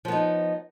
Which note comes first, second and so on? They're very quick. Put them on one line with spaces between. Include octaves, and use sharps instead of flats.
F3 B3 D#4